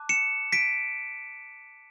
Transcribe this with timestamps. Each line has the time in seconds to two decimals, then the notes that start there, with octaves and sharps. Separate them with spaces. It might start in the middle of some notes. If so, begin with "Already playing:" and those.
Already playing: A5 D6 F#6
0.09 C#7 E7
0.52 B6 D7